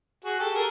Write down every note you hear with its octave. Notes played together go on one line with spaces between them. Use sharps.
F#4 G#4
G4 A4
G#4 A#4